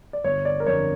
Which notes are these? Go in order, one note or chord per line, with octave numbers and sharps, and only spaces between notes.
D5
G1 C#5
D5
A#4
F2 D3 C#5